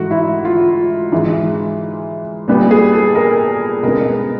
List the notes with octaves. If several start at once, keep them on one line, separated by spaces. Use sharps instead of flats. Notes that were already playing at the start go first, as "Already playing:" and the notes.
Already playing: G#2 E3 A3 F#4
E4
F4
G#2 E3 G#3
A#2 G3 B3
G#4
A4
A#4
B2 G#3 B3 A#4